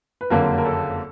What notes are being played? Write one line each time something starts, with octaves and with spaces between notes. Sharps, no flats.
B4
F#1 F2 D3 F#3 A#3 A#4
A#4
A4